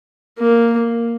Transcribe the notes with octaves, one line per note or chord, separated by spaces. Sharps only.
A#3